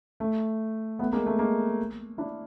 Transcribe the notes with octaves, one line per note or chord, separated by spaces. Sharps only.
A3
A3 B3
G#3 A#3
A3
G#3 A#3
D4 E4